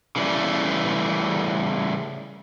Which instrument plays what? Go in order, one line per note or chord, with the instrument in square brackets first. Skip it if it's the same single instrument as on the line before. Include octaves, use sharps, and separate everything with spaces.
[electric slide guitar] C#3 E3 G3 A3